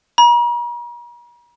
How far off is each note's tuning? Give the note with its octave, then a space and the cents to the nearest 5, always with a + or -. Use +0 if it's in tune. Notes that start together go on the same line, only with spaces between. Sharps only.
A#5 +45